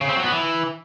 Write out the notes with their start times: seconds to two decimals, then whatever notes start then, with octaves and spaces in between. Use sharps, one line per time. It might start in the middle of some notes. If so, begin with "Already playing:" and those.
0.01 C#3
0.09 C4
0.16 F#3
0.24 B3
0.32 E3